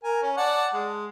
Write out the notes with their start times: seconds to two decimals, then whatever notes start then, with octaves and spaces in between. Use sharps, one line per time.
0.04 A#4 G#5
0.22 C#4
0.37 D5 F#5 A5
0.74 G#3